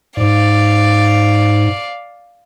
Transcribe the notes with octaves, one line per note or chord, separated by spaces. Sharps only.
G#2 D5 F5